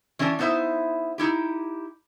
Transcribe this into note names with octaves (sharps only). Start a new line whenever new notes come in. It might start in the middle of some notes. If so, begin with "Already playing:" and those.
E3 C#4 D4 C5 A5
B3 D#4 E4 C5 E5
D#4 E4 G4